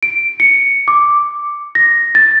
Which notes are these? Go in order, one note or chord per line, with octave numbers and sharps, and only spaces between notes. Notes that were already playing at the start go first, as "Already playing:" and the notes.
D7
C#7
D6
A#6
A6